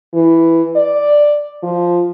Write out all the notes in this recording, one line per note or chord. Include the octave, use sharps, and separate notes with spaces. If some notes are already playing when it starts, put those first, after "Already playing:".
E3
D5
F3